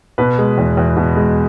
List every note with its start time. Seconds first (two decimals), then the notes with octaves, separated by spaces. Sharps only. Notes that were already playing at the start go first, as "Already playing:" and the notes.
0.18 B2 B4
0.38 G#3
0.58 E2
0.77 E2
0.97 B2
1.17 G#3